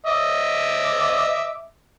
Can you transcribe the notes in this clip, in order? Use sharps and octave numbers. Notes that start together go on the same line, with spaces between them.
D#5 E5 D6